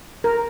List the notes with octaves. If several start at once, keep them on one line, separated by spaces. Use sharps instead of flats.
A#4